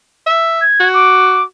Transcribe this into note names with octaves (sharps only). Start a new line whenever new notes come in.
E5
G#6
F#4
D6